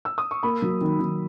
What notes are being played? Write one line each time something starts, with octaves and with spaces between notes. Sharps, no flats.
E6
D#6
C#6
A#3 B5
F#3
D#3
D#3